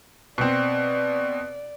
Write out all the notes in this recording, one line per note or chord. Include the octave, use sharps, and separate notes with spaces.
B2 C4 D5